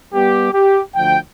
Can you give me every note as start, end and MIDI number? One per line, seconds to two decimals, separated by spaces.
0.13 0.48 55
0.13 0.48 59
0.13 0.48 67
0.52 0.80 67
0.95 1.17 38
0.95 1.17 53
0.95 1.17 79